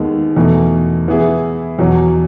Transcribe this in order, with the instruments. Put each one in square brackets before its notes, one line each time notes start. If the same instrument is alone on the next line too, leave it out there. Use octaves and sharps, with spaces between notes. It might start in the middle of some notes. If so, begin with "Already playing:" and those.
Already playing: [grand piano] D#2 D#3 G#3 B3
E2 B2 A3
E3 B3 E4 G#4
E2 B2 F#3